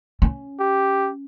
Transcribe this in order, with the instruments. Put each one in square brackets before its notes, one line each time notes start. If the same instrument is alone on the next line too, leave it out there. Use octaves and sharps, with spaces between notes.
[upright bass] C#4
[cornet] G4